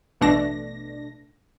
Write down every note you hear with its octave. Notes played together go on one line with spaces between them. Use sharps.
A1 B2 A3 D4 A#6